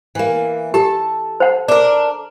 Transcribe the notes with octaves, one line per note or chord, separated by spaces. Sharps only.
E3 A#3
G4 A4 A5
C5 F#5
D4 A#4